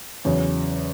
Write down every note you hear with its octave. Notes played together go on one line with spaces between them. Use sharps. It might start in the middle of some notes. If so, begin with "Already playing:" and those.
E2 C#3 F#3